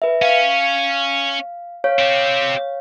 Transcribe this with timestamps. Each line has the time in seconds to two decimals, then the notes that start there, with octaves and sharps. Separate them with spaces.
0.02 B4 E5
0.22 C#4 F5
1.84 C#5 F5
1.99 C4 G4